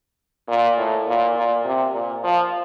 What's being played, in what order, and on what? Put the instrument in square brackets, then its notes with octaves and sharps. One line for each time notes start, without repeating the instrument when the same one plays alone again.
[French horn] A#2
A2
A#2
A#2
C3
A#2
F3